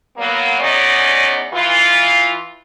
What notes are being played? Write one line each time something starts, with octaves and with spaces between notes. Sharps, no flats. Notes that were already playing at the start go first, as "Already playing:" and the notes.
F#3 A#3 B3
E2 B3 C#4 D#4 D5 D#5
E3 F4